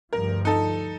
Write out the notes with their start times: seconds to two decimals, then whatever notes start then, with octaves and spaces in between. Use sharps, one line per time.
0.13 D2 G2 F3 A#4
0.45 D#4 A4